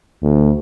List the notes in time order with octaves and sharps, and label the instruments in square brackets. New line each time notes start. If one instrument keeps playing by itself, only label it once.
[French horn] D2